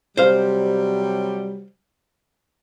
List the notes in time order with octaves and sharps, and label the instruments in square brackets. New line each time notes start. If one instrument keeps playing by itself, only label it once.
[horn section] C3 F#3 G3 [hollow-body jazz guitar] C5 F5